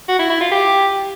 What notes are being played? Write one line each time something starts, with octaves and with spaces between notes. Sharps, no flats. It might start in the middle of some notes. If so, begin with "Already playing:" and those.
F#4
E4
E4
F4
G4